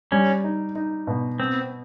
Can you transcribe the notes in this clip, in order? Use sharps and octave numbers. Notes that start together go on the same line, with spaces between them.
G3 C#4
D#4
D#4
B2
B3 C4